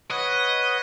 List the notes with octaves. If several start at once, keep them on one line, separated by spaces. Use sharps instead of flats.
B4 C#5 D#5 F#5